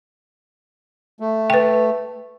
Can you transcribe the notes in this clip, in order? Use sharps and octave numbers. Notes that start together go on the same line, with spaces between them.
A3
B4 G5